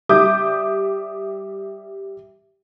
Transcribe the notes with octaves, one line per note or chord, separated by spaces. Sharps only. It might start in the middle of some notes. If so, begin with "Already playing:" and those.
G3 E5 D6 D#6 G6